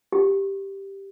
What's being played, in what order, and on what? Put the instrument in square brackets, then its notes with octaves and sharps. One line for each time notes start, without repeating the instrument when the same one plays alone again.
[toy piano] G4